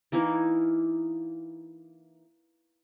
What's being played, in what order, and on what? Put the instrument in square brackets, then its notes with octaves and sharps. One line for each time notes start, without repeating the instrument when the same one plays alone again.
[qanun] E3 A#3 D#4 E4